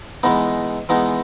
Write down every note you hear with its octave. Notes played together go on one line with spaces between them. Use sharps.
E3 G#3 B3 D#4
E3 G#3 B3 D#4